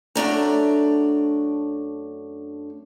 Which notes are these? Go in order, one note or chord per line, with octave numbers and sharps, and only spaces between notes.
F#2 A3 D4 A#5